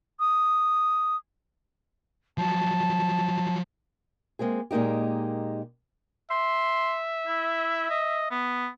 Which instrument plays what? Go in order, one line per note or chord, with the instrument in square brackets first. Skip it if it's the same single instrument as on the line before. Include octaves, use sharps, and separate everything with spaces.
[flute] D#6
[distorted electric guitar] F3 F#3 [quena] A5
[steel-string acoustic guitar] G#3 A#3 C4 G#4
A#2 G#3 A#3 D#4 G4
[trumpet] E5 [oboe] C6
[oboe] E4
D#5
B3